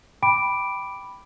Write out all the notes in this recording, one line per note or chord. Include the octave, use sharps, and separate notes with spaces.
G5 B5 D6 D7